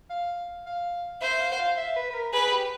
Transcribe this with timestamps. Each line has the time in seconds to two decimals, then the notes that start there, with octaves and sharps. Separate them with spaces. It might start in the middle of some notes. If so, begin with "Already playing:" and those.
0.10 F5
0.66 F5
1.21 C5 E5
1.40 F5
1.52 F#5
1.59 F5
1.77 E5
1.96 B4
2.10 B4
2.14 A#4
2.33 G#4 B4
2.51 G4